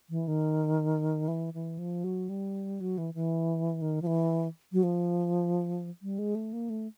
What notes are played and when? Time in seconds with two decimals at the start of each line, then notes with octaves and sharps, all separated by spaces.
0.10 E3
0.28 D#3
1.28 E3
1.54 E3
1.78 F3
2.04 F#3
2.29 G3
2.81 F#3
2.98 E3
3.14 E3
3.82 D#3
4.02 F3
4.07 E3
4.73 F#3
4.83 F3
6.02 G3
6.19 G#3
6.35 A3
6.53 A#3
6.70 A3